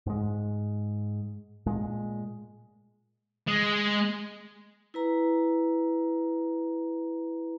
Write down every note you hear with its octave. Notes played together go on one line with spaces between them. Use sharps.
G#2 G#3
A#2 G#3
G#3
E4 B4 A#5